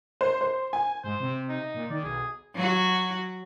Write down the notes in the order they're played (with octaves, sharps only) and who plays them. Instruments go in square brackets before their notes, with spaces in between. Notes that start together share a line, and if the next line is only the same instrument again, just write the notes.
[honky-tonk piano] C5
C5
G#5
[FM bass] G#2 [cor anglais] C5
[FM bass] C3
[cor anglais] D#4
[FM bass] A#2
[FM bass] D#3 [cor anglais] D5
[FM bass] B1 [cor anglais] G#4
[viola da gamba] F#3 F#4